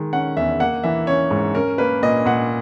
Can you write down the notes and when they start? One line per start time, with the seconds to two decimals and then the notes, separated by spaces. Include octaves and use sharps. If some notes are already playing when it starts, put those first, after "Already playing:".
Already playing: D#3 G#3
0.13 C#4 F#5
0.37 E2 E5
0.60 A#3 F#5
0.83 E3 E5
1.07 C#4 C#5
1.31 G#2
1.55 C#4 A#4
1.78 A#3 B4
2.02 A#2 D#5
2.26 A#2 F#5